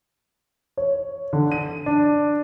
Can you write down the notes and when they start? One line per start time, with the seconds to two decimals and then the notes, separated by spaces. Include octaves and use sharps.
0.77 C#5
1.33 D3
1.52 D#7
1.86 D4